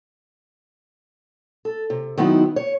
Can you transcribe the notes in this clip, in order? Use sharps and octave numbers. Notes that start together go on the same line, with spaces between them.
A4
C3
D#3 F#3 B3 C4 D#4 E4
C#5